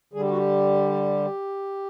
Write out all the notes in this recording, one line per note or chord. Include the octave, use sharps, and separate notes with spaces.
D3 G3 G#4
G4
F#4
G4